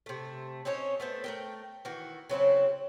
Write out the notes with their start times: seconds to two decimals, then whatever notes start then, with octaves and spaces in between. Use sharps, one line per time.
0.06 C3 A3
0.65 C4 C#4 D#4 C#5
1.00 A3 B3 C4
1.24 A3 A#4 G5
1.85 D#3 E3 F#4
2.29 C#3 F#3 C4 E4